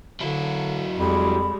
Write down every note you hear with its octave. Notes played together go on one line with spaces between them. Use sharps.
D3 F#3 E4
F2 G3 G#3 B5